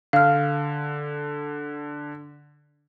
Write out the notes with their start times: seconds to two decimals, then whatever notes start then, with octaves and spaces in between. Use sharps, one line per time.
0.13 D3 F5 F6